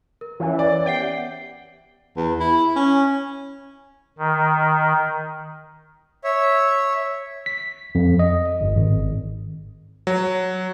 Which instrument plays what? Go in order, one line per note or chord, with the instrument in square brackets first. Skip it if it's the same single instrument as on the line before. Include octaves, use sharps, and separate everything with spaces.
[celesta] A#4
[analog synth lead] E3 [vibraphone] C#4 C#5
[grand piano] D5
[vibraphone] B3 G4 C5 [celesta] E5 F#5 C7 [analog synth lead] G5
[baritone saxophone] E2
E4
C#4
[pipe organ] D#3
[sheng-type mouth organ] C#5 E5
[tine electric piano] B6
F2
D#5
G1
G#1
[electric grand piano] F#3